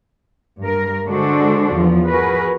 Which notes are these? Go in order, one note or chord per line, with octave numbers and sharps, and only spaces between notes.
G2 A#4
D3 G#3 D4 F#4 A4 C5
E2 F3
F#4 G#4 A#4 B4